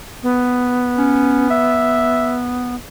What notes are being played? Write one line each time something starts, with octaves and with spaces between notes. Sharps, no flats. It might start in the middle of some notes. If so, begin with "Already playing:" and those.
B3
C#4
E5